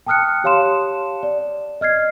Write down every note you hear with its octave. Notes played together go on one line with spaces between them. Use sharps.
G5 A5 D#6 F6 F#6 C#7
G4 C#5 F5 A5 C6 E7
D5
D#5 F6 G#6 C7